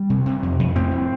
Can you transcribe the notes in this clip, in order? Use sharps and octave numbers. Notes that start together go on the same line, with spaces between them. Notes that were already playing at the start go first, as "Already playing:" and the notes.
Already playing: G3
C3
C3
F2
F2
A2 C4
A2